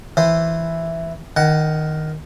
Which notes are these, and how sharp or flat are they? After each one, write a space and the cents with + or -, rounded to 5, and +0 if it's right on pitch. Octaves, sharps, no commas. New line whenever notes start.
E3 +0 C5 +0
D#3 +0 F#5 +15